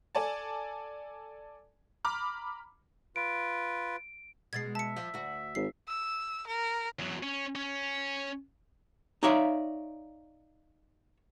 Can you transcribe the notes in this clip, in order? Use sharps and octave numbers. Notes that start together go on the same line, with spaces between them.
A4 D5 G#5 A5
A#5 B5 D6 F6
F4 B4 D7
B2 G#3 G#6 A6 C7
E5 A5 C#7
F3
D2 F#4
G#1 C7
E6
A#4
E2 F#3
C#4
C#4
D#4 C#5 D5 E5 F5